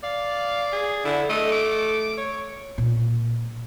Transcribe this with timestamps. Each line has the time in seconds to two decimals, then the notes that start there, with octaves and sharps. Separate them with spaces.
0.03 D5 F5
0.72 G#4
1.05 D3 E4
1.29 A3 D#5
1.52 D6
2.17 C#5
2.78 A#2 A#3